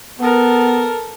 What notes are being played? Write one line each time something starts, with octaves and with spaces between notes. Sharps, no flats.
B3 A4 A#4